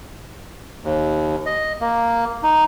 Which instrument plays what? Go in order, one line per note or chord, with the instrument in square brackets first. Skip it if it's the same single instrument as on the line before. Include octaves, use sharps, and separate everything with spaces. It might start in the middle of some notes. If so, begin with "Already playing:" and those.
[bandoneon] D#2
D#5
A#3
D#4